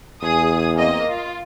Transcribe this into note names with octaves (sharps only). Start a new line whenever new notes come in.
E2 G#4 D#6
A#3 C4 D#5
F4